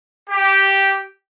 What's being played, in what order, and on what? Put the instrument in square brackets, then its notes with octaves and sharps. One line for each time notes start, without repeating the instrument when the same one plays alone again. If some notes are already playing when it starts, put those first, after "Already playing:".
[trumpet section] G4